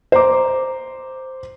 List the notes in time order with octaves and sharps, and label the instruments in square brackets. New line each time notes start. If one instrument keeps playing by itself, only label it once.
[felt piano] C5 A#5 D6